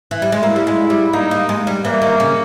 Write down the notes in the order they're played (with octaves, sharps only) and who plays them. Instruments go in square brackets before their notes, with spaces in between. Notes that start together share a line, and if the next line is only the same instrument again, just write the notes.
[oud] E3
G3
G#3
[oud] A#3 [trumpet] E4
[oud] G3
G#3
G3
[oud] A#3 [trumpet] D#4
[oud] A#3
G#3
G3
[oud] E3 [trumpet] A#3
[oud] D#3
C#3